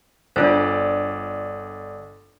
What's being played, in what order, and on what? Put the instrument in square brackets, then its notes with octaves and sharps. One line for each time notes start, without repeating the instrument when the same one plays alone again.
[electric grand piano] G1 A4 D5 [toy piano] D4 F4 C5